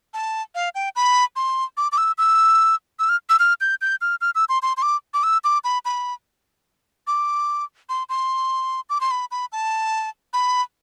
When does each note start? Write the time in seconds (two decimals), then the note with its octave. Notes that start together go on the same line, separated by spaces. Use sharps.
0.14 A5
0.55 F5
0.75 G5
0.96 B5
1.36 C6
1.77 D6
1.92 D6
1.98 E6
2.18 E6
2.99 E6
3.09 F6
3.29 E6
3.39 F6
3.61 G6
3.81 G6
4.01 F6
4.21 F6
4.35 E6
4.49 C6
4.63 C6
4.77 C6
4.82 D6
5.14 D6
5.23 E6
5.44 D6
5.64 B5
5.85 B5
7.07 D6
7.89 C6
8.09 C6
8.90 D6
9.01 C6
9.11 B5
9.31 B5
9.52 A5
10.33 B5